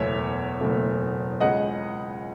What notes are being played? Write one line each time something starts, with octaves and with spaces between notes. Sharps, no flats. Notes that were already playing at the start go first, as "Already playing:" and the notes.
Already playing: F#1 E2 B2 A3 C#5 E5
F#1 E2 B2 A3
C#2 C#3 G#3 D#5 F#5